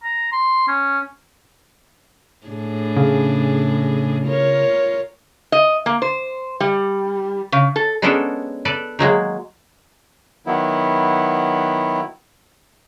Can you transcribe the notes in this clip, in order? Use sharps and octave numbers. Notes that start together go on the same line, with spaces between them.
A#5
C6
C#4
A2 D4 G#4
C#3
F4 A#4 C#5
D#5
A#3
C5
G3
C#3
A4
G#3 B3 C#4 D4 A4 A#4
A4 B4 D5
D#3 F#3 G#3 A#3
D#3 F#3 B3 E4